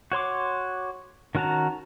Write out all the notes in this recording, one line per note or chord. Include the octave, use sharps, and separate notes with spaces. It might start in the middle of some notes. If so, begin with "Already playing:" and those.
F#4 C#5 C6 D6
D#3 C#4 F#4 A5 A#5